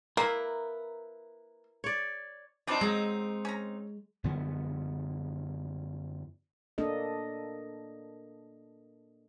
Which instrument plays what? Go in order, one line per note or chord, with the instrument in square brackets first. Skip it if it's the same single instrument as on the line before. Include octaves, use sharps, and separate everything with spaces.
[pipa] A#3 [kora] E4 B4 [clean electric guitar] A#4
[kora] C#5 D5
[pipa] F3 G3 D4 [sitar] C4 D#4
[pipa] F#3 D#5 [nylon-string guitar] G#3
[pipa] C#4 A#5
[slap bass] F#2 D3 F3 B3
[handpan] A#3 D4 A4 D#5